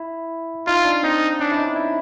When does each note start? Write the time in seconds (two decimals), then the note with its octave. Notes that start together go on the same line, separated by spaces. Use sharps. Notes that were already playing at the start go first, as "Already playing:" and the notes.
Already playing: E4
0.67 D#4 F4
0.85 D4
1.03 C4 D#4
1.40 C#4 D4
1.52 E4
1.58 D#4
1.76 E4